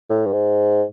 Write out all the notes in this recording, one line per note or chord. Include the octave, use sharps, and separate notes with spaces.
A2
G2
G#2